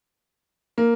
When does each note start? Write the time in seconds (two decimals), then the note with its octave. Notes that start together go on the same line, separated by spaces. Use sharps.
0.78 A#3